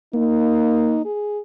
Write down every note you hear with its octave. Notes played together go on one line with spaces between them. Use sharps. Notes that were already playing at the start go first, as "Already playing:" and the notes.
A#3 D#4
G#4